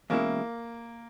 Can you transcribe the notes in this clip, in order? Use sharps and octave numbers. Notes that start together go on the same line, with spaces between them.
E2 B2 G#3 A#3 C#4 E4